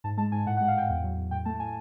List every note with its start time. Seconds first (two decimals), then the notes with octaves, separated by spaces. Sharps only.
0.04 G#2 A5
0.17 G#3 A5
0.32 G#2 G#5
0.46 A2 F#5
0.57 F#5
0.60 G#3
0.68 F5
0.75 A2 G5
0.89 E2
1.04 F#3
1.17 E2
1.31 A2 G5
1.45 A3 A5
1.60 A2 G#5